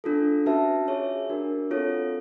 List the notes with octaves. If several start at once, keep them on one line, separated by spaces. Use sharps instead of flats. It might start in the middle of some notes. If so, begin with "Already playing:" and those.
D4 F4 A4
C#4 F#4 B4 E5 A5
F4 G#4 C#5 E5
D4 F#4 A#4
C4 F4 A4 C#5